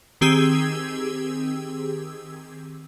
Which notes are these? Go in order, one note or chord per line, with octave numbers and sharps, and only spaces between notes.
D#3 C4 G4 G#4 E6 G#6